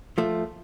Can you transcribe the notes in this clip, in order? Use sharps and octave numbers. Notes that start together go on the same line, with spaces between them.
F3 A3